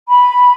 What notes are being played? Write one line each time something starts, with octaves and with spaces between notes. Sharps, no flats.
B5